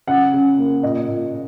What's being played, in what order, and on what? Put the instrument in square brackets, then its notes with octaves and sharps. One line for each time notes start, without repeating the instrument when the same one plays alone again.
[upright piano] C#3 F#5
C#3
A#3
A#2 D#5
A#2